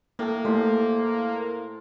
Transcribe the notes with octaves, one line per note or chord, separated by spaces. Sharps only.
A2 A#3 A4
A3 E4 C5